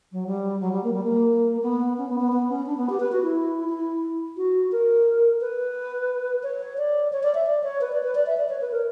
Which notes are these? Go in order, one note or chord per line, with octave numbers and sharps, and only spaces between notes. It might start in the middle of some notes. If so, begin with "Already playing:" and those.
F#3
G3
F#3
G3
A#3
G3
A#3
B3
C#4
B3
B3
B3
C#4
D4
B3
G4
B4
F#4
E4
E4
F#4
A#4
B4
C#5
D5
C#5
D5
E5
D5
C#5
B4
D5
B4
D5
E5
D5
C#5
B4
A#4